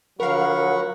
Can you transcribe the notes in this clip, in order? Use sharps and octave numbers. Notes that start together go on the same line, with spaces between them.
D3 F3 F#3 A#4 F5 F#5 B5 C#6